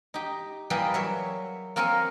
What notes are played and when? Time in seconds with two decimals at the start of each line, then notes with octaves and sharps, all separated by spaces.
0.14 D#4 G4
0.70 E3 G3 A#3 G4 G#4
0.94 F#3 C#5 E5
1.76 A#3 C4 A#4 C#5 G#5